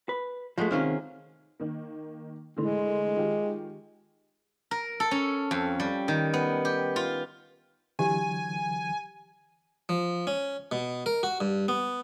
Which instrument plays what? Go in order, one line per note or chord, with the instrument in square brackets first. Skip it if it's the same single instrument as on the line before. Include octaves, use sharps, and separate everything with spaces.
[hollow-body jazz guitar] B4
[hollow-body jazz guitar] F3 A3 [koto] G#3 F#4
[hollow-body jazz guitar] C3 D#3 C4 [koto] A#3 C#4 F4
[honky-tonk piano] D#3 A#3
[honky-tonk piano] A2 D3 E3 [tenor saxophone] G#3
[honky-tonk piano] D#3 F4 G4
[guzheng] A#4
A4
C#4
F2
G3
D#3
B3
G4
F4
[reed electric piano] D3 E3 F#3 [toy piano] G4 [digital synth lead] G#5
[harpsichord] F3
C#4
B2
A#4
F#4
G2
B3